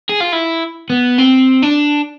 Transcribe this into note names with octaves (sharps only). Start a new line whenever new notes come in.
G#4
F4
E4
B3
C4
D4